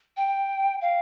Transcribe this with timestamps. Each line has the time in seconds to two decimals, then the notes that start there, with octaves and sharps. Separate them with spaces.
0.17 G5
0.81 F5